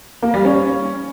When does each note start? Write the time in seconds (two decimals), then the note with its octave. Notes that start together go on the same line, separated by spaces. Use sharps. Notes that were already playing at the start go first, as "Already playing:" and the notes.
0.22 A#3
0.34 G3
0.45 C#4